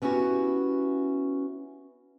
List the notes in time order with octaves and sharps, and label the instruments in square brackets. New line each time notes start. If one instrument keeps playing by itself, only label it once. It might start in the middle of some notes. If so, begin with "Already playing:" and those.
[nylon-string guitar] B3 C#4 D4 E4 F#4 G4